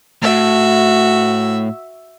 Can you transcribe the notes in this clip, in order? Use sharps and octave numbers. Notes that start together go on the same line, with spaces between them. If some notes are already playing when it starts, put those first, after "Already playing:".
A2 F#4 E5